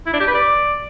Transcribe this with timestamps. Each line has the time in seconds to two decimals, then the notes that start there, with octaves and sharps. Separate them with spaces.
0.06 E4
0.13 D4
0.20 G4
0.27 B4
0.35 D5